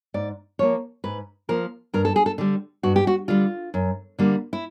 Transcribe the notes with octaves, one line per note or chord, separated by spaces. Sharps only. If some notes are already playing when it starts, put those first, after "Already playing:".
G#2 D5
F3 A#3 C#5
G#2 B4
F3 A#3 A#4
G2 A#4
A4
G#4
A4
D3 G3
G2 F#4
G4
F#4
D3 G3 F4
F#2
D3 G3 A#3
E4